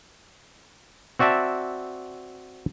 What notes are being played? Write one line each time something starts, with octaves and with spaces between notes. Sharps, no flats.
C4 F#4 D5 E5 A5